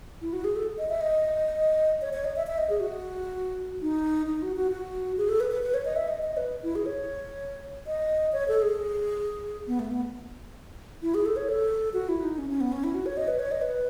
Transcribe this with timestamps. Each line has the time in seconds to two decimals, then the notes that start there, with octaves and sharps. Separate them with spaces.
0.22 E4
0.33 F#4
0.44 G#4
0.56 A4
0.78 D#5
0.89 E5
1.01 D#5
2.02 C#5
2.13 C#5
2.25 D#5
2.36 E5
2.47 E5
2.58 D#5
2.70 G#4
2.80 F#4
3.82 D#4
4.26 D#4
4.42 F#4
4.56 F#4
4.72 F#4
5.18 G#4
5.29 A4
5.40 B4
5.51 B4
5.62 B4
5.74 C#5
5.85 D#5
5.96 E5
6.08 D#5
6.22 D#5
6.37 B4
6.63 E4
6.75 G#4
6.86 C#5
7.87 D#5
8.33 C#5
8.48 A4
8.62 G#4
9.67 B3
9.79 A3
9.91 B3
11.02 E4
11.14 G#4
11.26 A4
11.36 C#5
11.49 A4
11.93 F#4
12.09 E4
12.23 D#4
12.38 C#4
12.50 C#4
12.61 B3
12.72 C#4
12.84 E4
12.94 F#4
13.06 C#5
13.17 D#5
13.28 B4
13.39 C#5
13.51 D#5
13.62 B4